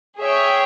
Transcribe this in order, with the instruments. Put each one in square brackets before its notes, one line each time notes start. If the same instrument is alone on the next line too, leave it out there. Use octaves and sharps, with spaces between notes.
[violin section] G#4 C#5 E5 G5